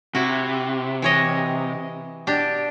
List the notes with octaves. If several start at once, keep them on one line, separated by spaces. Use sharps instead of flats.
C3 E4 F#4
E3 C#5 D#5
B2 D4 G4